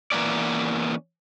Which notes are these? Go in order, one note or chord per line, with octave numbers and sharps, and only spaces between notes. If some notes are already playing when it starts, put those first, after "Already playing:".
E3 A#3 B3 C#4 D5